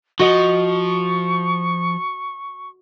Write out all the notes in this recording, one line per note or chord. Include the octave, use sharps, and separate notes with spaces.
F3 F#4 D#5 C#6